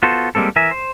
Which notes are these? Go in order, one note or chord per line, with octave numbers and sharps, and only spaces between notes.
B3 F4 F#4 A4 C5
G3 G#3 A#3 C4 A4
E3 A#4 E5 G#5
C5